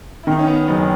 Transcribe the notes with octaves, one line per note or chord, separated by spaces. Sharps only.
E4
D#3 D#4
C#4
B3
F#1 D#4
C#4